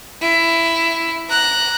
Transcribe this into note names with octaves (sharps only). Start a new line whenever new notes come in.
E4
A#5 F#6